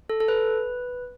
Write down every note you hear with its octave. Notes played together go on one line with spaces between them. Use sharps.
A4
A4
B4